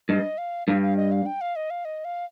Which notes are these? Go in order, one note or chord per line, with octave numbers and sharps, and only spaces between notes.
G2 D#5
F5
G2 F5
F5
D#5
F5
G5
F5
D#5
F5
D#5
F5